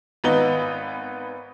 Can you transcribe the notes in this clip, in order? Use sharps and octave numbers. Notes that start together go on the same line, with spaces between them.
G#1 B3 D#4 B4 G7